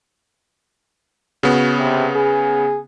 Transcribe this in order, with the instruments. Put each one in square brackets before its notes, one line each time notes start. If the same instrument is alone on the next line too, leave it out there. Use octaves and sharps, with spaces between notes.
[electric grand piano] C#3 B3 [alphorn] F#4
[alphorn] C3
G#4